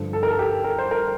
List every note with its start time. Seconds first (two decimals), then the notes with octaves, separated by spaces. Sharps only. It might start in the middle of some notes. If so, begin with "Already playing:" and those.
Already playing: G2 D3 F3
0.13 A4
0.23 A#4
0.30 A4
0.39 G4
0.64 A#4
0.78 C5
0.91 A#4